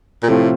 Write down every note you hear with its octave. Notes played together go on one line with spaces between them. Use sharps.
A#2
A2 C3 F3 A3 C4 F4